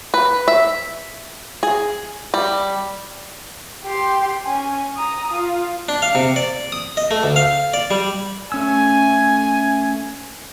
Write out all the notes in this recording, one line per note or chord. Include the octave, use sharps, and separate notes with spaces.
B4
E5
G#4
G3
G4 C6
C#4 G#5
A#5 D#6
F4
D4
F5
C3
D5
D#6
D#5
A3
D2
F5
D5
G3
A3 C#4 G#5 E6